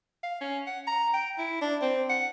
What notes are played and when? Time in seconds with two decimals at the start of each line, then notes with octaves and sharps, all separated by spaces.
0.23 F5
0.41 C#4
0.67 F#5
0.87 A#5
1.14 G5
1.38 E4
1.61 D4
1.82 C4
2.09 F#5